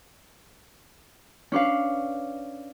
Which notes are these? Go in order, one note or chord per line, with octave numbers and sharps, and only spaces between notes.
C#4 D4 B4 F5